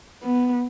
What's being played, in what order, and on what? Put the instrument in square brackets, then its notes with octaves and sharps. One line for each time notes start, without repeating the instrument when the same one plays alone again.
[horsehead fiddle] B3